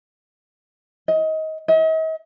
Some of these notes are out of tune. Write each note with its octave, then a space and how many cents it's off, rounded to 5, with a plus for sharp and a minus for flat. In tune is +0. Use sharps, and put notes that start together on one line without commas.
D#5 +25
D#5 +45